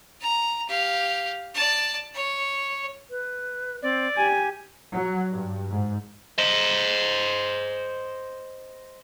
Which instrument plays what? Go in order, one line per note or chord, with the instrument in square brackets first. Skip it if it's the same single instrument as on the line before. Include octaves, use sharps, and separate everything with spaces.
[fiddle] A#5
G4 F5
D5 A5
C#5
[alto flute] B4
[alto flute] C4 [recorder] D5
[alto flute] G4 [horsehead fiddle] G#5
[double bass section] F#3
G2
G#2
[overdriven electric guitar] C5 D#5